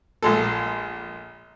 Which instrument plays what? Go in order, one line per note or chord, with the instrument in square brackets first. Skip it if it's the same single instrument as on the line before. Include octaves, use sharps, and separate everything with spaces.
[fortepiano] A#1 G#3 A4